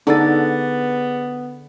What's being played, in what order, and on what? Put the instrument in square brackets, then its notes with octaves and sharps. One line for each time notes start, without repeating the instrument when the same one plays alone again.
[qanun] D3 [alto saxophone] B3 [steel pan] D4 D#4 A4 [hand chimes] G#4 A6